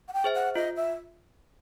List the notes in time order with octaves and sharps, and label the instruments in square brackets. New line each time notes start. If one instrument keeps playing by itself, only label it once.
[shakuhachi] F#5
G5
[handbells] G#4 C5 E5
[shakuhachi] F#5
[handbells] F4 [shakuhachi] D#5
[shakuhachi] E5